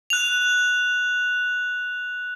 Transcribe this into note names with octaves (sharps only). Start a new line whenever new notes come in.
F#6 F7